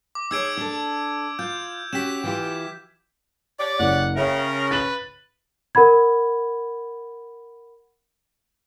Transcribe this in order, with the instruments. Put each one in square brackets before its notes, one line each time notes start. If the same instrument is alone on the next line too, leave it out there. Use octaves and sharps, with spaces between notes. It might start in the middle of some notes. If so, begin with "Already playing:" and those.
[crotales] D6
[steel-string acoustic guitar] D#4 G#4 C#5 [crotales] E6 G#6 D7
[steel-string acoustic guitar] D4 A4
[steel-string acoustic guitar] F4 [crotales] G6
[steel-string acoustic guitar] C#4 F#4 G4 [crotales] B6 E7
[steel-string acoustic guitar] E3 F4 G4
[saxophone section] G4 C#5 D5
[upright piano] F#1 [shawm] F#5
[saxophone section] C#3 [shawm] A#4 [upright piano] E5 F5 G5
[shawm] B4 [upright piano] A6 F#7
[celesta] A#4 F#5 B5 G#6